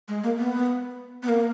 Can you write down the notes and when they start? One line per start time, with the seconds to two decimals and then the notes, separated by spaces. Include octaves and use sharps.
0.08 G#3
0.24 A#3
0.38 B3
1.23 B3
1.29 A#3